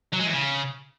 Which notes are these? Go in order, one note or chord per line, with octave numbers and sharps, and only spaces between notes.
F#3
G#3
E2
C#3